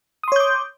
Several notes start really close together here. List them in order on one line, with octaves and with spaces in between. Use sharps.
D#6 C6 C#5 G6 D6